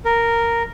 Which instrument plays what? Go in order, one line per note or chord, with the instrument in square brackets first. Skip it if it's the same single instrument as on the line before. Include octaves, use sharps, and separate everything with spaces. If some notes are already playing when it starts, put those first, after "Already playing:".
[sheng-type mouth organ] A#4